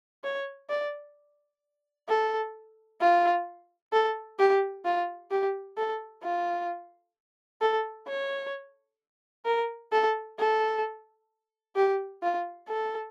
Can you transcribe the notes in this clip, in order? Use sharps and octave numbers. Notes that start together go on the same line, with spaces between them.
C#5
D5
A4
F4
A4
G4
F4
G4
A4
F4
A4
C#5
A#4
A4
A4
G4
F4
A4